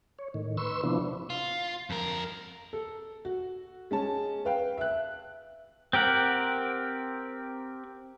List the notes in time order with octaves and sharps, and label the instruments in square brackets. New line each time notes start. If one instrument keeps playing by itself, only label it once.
[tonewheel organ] C#5
A2 D#3
B4 C6 C#6 E6
C3 F3 B3 D4 E4
[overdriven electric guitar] F4
F2 A#4
[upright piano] A4
F#4
G#3 C#4 A5
B4 F5 G5
E5 F#6
[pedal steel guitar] C4 G4 A#4 F#5